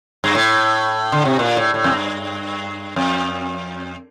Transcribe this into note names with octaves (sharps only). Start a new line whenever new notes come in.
G2
A2
D3
C3
A#2
A2
A2
F2
G2
F2